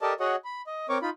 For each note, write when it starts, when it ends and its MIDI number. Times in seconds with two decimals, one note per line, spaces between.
0.01 0.13 67
0.01 0.13 69
0.01 0.13 70
0.01 0.13 74
0.01 0.13 75
0.01 0.13 81
0.20 0.36 66
0.20 0.36 68
0.20 0.36 73
0.20 0.36 75
0.20 0.36 78
0.45 0.62 83
0.67 0.87 75
0.89 0.98 60
0.89 0.98 70
0.89 0.98 73
0.89 0.98 85
0.89 0.98 86
1.02 1.10 63
1.02 1.10 65
1.02 1.10 83